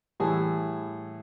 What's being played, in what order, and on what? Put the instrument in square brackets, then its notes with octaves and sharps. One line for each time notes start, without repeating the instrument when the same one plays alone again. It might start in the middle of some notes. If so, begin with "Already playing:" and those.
[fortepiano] A2 E3 G3 G#4